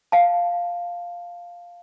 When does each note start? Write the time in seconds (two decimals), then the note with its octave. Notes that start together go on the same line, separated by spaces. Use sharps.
0.12 F5 A5